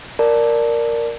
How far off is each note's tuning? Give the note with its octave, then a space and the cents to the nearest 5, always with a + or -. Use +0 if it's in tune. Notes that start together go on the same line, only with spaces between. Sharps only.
A#4 +0 D5 +0 A5 -5